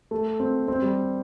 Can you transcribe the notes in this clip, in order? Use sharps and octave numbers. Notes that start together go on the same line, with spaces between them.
A3
C4
C4
G3